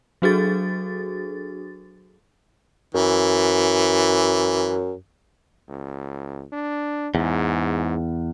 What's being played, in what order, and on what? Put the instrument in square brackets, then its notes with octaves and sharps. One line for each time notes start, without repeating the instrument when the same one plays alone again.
[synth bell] F#3 D4 F#4 G#4 A4 A6
[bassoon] F#2 [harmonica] E3
[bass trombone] C#2
D4
[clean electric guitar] E2 [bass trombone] G#2